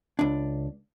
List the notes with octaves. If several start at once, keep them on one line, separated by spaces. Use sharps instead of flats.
C#2 D4